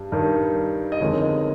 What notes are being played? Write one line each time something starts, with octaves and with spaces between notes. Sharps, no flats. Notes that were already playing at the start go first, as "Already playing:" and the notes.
Already playing: G2 G3
G2 D#3 G3
D#5
G1 F2 D#3 G#3 C#5
D#5